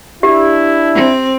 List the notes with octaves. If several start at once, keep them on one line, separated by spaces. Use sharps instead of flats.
D4 E4 G4
C4